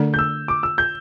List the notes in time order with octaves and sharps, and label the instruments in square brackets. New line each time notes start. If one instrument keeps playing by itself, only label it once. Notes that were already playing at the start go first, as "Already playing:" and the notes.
Already playing: [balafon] D3 A3 D4 A4 D5
[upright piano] G6
E6
D6
E6
G6